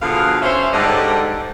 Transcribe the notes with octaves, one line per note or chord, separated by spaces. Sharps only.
B2 D3 F3 G#4 F5
C#4 C5 E5
G#2 D3 G3 A4 D5 D#5